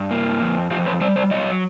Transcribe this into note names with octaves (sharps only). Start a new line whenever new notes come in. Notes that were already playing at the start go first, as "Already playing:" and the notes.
Already playing: G2
A#3
F2
F2 F4 G4
B4 C#5
G3 C5 D5
C5 D5
F#3 C#5 D#5